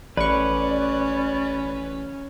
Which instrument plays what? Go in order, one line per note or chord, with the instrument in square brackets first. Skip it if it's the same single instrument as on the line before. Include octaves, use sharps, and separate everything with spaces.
[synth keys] A1 C#6 [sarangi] C#4 [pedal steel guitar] B4 [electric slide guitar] D5